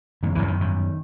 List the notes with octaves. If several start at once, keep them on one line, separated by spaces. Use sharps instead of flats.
F#2 D#3
E2 E3
F#2
D#3
G#2 D#3